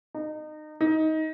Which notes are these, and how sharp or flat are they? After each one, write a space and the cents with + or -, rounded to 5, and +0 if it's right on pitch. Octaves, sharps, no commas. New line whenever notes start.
D#4 -25
D#4 +20